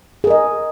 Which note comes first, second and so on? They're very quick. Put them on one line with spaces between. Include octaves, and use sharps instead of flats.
G#4 A#4 D#5